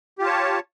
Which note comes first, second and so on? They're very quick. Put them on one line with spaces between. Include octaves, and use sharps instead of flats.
G4 F4 A5 C#5